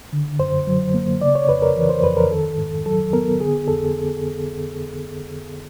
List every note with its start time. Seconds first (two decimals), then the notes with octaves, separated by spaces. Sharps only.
0.13 D3
0.39 F#2 C5
0.67 F#3
0.94 A#3
1.21 C#3 D5
1.35 C#5
1.49 F2 B4
1.62 A#4
1.77 E3
1.89 C5
2.04 F2 B4
2.17 A#4
2.31 D#3 A4
2.58 G#2
2.86 F#3 A4
3.13 B3 A#4
3.40 D3 G#4
3.68 F2 A4